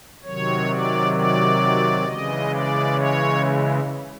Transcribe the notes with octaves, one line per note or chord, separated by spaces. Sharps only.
C3 D#3 F#3 C#5
D5
D5
C#3 E3 G#3 D#5
D5
C#5